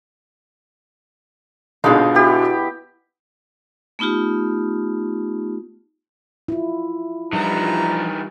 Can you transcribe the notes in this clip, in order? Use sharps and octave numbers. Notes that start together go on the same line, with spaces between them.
G#1 B2 D3 D#4 F4 G#4 F5
B3 E4 F#4 G4
A3 B3 D#4 F4 G4
E4 F4
E3 F3 G3 D4 D#4 A#5